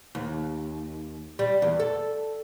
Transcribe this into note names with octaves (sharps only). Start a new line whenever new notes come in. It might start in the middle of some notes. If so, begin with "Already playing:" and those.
D#2
G3
E2
A4